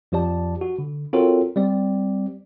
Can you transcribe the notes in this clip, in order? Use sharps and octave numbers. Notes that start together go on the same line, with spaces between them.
F2 F3 G4 D5 A5
F#4
D3
C4 F4 F#4 A4 A#4 C#5
G3 C4 D5